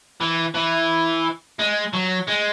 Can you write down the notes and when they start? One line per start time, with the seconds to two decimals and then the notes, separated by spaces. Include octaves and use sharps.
0.21 E3
0.54 E3
1.59 G#3
1.93 F#3
2.27 G#3